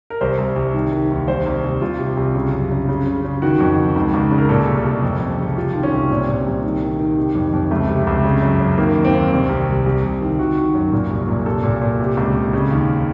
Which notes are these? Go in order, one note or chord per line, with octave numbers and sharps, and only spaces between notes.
A#4
C2 C5
C2
C2
D#3
D#3
D#2
C2 C5
C2
C2
C2 F4
C3
C2
C#3
F#2
C#3
C#3
C#3
C#3
D#3 F#4
F2
D#3
C#2
C#2
C#3
A#4
A#2 A4
C2
C2
F2
F2
C#3
C3 F4
D#3
C#4
C2
A#2 C4
A#2
C2
D#3
D#3
D#3
C3
F2
F2
C#2 A3
C3
C#2
C#3
F#2
F#2
D#3 A#3
D#2
C4
D#2
C2 C4
C2
C3
C2
C2
D#3
D#3 F#4
D#3
F#2
A#2
C2
A#2
C2 A4
A#2
A#2
C3
C#2
C#2
C#3
D#2